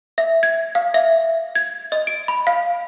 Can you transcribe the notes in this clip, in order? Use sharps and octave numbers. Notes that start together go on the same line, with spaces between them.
E5
G#6
F5
E5
G#6
D#5
D7
B5
F5